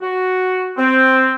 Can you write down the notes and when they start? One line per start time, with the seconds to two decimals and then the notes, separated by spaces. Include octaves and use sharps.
0.01 F#4
0.78 C4